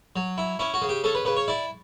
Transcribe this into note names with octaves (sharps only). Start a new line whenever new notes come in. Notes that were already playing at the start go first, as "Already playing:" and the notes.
F#3
E4
C#4 E4
F#4
C#3
G4
C#4 A4
B4
C#3 B4
C#5
E4 D5